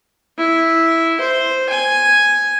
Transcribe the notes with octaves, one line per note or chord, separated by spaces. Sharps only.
E4
C5
G#5